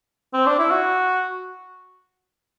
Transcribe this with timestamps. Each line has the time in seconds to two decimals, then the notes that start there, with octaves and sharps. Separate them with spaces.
0.33 C4
0.46 D4
0.59 E4
0.71 F#4